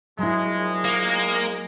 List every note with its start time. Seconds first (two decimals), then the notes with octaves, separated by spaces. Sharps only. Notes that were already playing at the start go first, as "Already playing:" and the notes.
0.19 A#1 F#3 G#3 E4
0.85 A#3